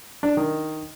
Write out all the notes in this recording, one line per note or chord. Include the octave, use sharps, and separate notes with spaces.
D4
D#3